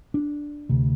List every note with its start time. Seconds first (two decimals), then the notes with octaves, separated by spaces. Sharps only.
0.14 D4
0.69 D2 C3